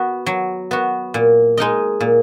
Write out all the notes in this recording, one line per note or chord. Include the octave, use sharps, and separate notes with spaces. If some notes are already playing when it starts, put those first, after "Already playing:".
Already playing: B3 F#4
F#3
B3 F#4
A#2
G#3 D#4 A#4 D#5
A#2